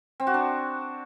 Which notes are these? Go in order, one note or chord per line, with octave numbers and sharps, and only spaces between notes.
C4
F#4
D4